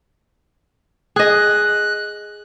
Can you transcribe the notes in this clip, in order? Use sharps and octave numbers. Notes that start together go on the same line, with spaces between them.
G#4 D#5 F#6